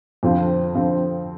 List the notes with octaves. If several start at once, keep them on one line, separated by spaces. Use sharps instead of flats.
F2 D3 F3 C4 F4
F2 D3 F3 C4 F4